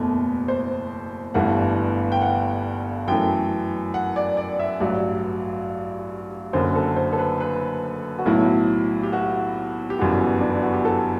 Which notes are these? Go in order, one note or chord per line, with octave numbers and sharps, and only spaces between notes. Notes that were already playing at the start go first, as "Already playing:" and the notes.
Already playing: F#1 E2 B2 A3
C5
G1 G2 E3 A3 F#5
G5
F#5
F#2 E3 A3 G5
F#5
D5
D5
E5
A1 G2 F#3 D5
F#1 F#2 D3 C5
A4
C5
A4
B4
B4
F#4
B1 A2 F#3 A3 E4
G4
F#4
G4
G1 F#2 E3 G3 F#4
D4
E4
F#4
G4
A4